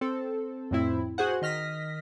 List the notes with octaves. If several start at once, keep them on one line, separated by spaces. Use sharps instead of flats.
C4 A4
F2 A2 C4 E4
F#4 G#4 C5 F#5
D#3 D#5 F6 A#6 B6